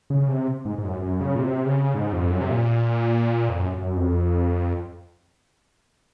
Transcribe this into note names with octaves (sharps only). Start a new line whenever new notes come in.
C#3
C3
G#2
G#2
F#2
F#2
C#3
A#2
C3
C#3
G#2
F2
F#2
C3
A#2
F2
F#2
F#2
F2